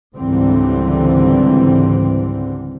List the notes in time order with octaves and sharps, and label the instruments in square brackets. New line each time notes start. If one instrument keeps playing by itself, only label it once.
[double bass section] C#2 G#2 D3 E3 G3 C4